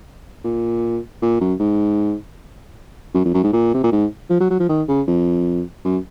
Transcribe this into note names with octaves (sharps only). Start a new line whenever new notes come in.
A#2
A#2
F#2
G#2
F#2
F2
F#2
G#2
A#2
C3
A#2
G#2
F3
F#3
F#3
F3
D#3
C#3
F2
F#2